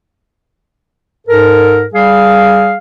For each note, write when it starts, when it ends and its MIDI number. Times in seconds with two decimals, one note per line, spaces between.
1.27 1.83 44
1.27 1.83 69
1.27 1.83 70
1.93 2.76 55
1.93 2.76 68
1.93 2.76 77